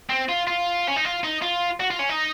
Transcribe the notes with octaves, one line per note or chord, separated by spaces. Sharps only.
C4
F4
F4
C#4
D#4
F4
D#4
F4
F#4
F4
C#4
D#4